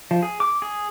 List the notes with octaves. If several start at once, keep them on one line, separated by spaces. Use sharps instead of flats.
F3
G#4
D6
G#4